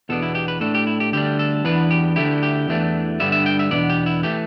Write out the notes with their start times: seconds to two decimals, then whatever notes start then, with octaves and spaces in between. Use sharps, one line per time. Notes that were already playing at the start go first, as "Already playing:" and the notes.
0.09 E2 B2 B3 D4 A4
0.22 E4
0.35 G4
0.48 B4
0.60 A2 A3 D4 A4
0.74 G4
0.87 E4
1.00 G4
1.12 D2 D3 G3 D4 G4
1.39 A4
1.64 E2 E3 B3 D4 B4
1.91 G4
2.16 D2 D3 A3 E4 G4
2.43 G4
2.68 E2 E3 A3 D4
3.20 G2 D3 G3 B3 E5
3.32 E5
3.46 G5
3.59 E5
3.71 E2 B2 B3 D4 D5
3.89 G4
4.06 E4
4.23 E3 A3 G4